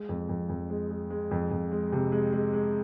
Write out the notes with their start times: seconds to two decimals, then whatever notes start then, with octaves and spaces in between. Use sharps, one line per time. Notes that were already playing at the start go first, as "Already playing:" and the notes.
Already playing: G#3
0.09 F2
0.29 F2
0.49 F2
0.70 G#3
0.90 G#3
1.10 G#3
1.31 F2
1.51 F2
1.71 G#3
1.92 C3
2.12 G#3
2.33 G#3
2.53 G#3